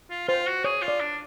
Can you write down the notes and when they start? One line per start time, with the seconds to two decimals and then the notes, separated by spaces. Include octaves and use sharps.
0.10 F4
0.28 F4 C5
0.46 F#4
0.64 G#4 C#5
0.82 F4
0.88 D5
1.00 D4